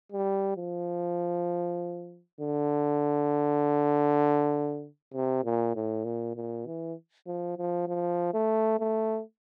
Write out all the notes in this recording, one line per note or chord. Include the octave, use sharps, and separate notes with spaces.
G3
F3
D3
C3
A#2
A2
A#2
A#2
E3
F3
F3
F3
A3
A3